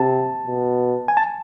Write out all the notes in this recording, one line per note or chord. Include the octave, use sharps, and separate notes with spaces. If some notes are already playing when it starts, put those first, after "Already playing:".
Already playing: C3 A5
B2
G#5
A5